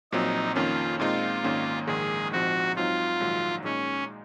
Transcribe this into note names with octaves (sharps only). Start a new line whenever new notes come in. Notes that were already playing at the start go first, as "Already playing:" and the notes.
A#1 A#2 F#3 C4 D#4
F2 D#3 A#3 C#4 F4
A#2 G#3 C4 D#4 F4
G#1 G#2 D#3 A#3 C#4
A#1 G#2 D#3 G#3 G#4
A#1 G#2 F3 C4 D#4 F#4
G#2 F#3 C4 D#4 F4
A#1 G#2 D#3 F#3
A#2 G#3 C#4 D#4